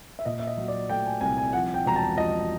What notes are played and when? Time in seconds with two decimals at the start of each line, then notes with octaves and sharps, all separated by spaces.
0.19 E5
0.26 A#2 D#5
0.40 E5
0.47 D#5
0.57 F#3
0.68 D5
0.89 A3 G5
1.06 G#5
1.21 C2 G#5
1.38 G#5
1.53 F3 F#5
1.74 G5
1.86 E1 A#5
1.96 A5
2.17 F3 D#5